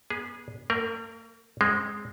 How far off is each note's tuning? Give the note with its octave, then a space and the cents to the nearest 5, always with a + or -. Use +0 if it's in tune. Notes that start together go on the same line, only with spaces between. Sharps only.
B3 -30 G#4 -5
A#3 -45 A#4 +0
G#3 -10 C4 +0